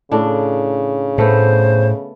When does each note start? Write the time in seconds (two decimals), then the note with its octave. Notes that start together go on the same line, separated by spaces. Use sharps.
0.11 A2 C#3 D4
1.18 A2 A3 B3 C5